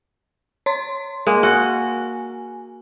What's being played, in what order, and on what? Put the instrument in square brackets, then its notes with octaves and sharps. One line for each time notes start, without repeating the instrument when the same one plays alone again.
[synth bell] C#5 C6
[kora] G#3 A#3
[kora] F#4 [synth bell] G#5